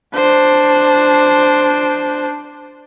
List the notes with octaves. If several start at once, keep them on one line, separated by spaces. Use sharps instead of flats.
D4 C5